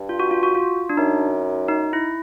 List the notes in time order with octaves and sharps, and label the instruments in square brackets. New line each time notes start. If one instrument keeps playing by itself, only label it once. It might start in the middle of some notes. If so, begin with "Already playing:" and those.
Already playing: [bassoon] G2
[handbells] F4
F#4
F4
F#4
F4
D4
[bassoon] F#2 [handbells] D#4
[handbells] D#4
E4